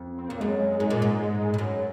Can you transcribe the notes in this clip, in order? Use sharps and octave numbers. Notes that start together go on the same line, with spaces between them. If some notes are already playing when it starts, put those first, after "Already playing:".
Already playing: F2
C4
F2 A#3
F#2 G#3
G#2
A#2
G#2
G#3
F2
F#2